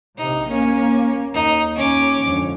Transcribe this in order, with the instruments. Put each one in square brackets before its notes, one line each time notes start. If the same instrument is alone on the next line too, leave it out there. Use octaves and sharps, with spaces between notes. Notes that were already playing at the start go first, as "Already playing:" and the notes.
[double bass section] A#1 C3 [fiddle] D#4
[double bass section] A#3 [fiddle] C#4
[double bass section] D#2 [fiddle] D#4
[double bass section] D#2 [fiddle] C#4 D6
[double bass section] F2 G#2 D3